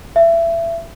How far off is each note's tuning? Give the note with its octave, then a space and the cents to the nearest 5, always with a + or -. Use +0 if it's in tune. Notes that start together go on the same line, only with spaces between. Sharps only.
E5 +25